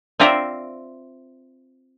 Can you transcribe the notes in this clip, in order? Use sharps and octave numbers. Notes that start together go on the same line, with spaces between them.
C4 F4 C5 D5 E5 A#5